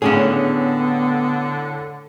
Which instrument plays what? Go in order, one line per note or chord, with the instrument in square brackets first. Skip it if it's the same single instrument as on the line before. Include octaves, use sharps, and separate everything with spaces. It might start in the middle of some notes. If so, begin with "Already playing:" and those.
[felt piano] A2 [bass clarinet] D3 [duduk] B3 [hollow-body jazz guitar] C#4 D4 G#4